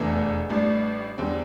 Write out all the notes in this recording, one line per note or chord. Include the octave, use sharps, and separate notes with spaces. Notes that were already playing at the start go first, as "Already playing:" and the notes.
Already playing: F1 E2 E3 A3 D4
A1 A2 G3 D4
E2 D3 G3 C4